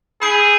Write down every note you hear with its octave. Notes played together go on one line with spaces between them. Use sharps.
G#4 B5 E6 G6 B6 D7